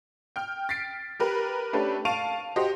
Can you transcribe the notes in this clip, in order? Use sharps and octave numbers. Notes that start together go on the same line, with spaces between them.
G5 F6
A6 B6 C7 D7
G4 A#4 B4
A3 C#4 D4 G4 B4
F5 A5 C#6 D7 D#7 F7
F#4 G4 C5 D#5